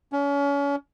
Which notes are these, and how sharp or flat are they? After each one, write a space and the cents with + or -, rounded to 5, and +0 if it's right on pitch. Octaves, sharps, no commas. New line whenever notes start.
C#4 +35